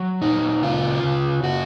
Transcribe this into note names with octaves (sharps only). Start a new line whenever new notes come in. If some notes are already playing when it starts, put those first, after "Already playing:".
Already playing: F#3
A#2 D#4
C#3 F4
C#3
C#3 F#4